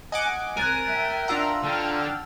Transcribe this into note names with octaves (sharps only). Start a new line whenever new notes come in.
D#5 F#5 G#5 D6
C2 A#4 G#5 F#6 A6 D#7
E5 G5
D4 F4 F#5 A#5 E6
D3 G5 A5 F6